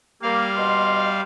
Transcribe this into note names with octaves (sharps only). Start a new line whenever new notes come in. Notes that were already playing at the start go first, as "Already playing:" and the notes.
G3 A#3 F5
B2 D#5 C6